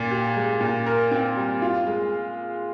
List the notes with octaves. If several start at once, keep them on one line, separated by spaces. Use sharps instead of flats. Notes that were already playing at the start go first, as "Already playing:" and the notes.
Already playing: A#2
G4
G#3
A#2
A#4
C4
G3
F4
G#3